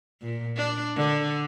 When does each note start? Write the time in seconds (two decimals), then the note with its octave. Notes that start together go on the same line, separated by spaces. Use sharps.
0.22 A#2
0.57 D4
0.96 D3